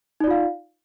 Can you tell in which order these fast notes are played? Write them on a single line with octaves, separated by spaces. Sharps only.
D#4 D5 F4 F5